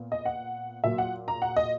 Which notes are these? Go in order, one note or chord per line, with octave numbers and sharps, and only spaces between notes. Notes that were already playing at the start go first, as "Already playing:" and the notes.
Already playing: A#2 B3
D#5
F#5
A#2 F#3 A#3 E5
F#5
A#5
F#5
D#5